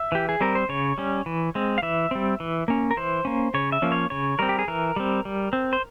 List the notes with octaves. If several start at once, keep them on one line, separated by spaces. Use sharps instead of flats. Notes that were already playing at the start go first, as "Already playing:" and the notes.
Already playing: E5
E3 G4
G#4
G3 C4 A#4
C5
C#3 C#5
G3 C#4
E3
G#3 C4
F5
E3 E5
G3 C4
E3
A#3 C#4
A#4
E3 C5
A#3 C#4
C#3 C#5
E5
F3 A#3 C#4
C#5
C#3 C#5
G3 C4 A#4
G4
G#4
E3 A#4
G3 C4
G3
C4
C5